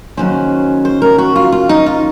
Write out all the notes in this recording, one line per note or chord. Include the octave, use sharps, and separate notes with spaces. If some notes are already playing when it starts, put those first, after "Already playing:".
D#2 C#3 F#3 C#4 C5
C5
A#4
F#4
F4
F4
D#4
F4